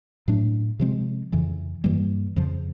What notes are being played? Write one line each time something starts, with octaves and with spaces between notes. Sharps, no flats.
A2 F#3 A3 D4
C3 F3 G#3 C4
F2 C#3 E3
G2 E3 G3 A#3
F2 C#3 F3